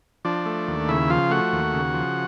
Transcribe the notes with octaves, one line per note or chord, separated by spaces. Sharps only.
F3 D4 D5
A3
D#2
C#3 E4 E5
F3 F4 F5
A3 F#4 F#5
D#2
C#3
F3